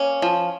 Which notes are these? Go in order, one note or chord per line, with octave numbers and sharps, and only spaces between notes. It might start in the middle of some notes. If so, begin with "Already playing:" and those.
Already playing: A#3 C#4
F3